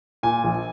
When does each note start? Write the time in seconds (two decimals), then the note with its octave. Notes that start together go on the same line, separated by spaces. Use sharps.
0.23 A#2 G#5
0.44 A#1